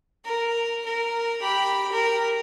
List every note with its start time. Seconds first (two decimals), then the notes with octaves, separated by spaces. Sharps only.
0.25 A#4
0.85 A#4
1.42 G4 B5
1.92 A#4